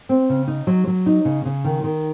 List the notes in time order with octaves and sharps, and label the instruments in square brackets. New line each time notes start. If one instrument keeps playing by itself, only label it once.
[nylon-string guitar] C4
C#3
D#4
F#3
F#3
D#4
C#3
C#3
D#3
D#3